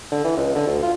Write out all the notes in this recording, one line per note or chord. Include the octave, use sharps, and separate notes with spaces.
D3
E3
C#2
D3
D2
F4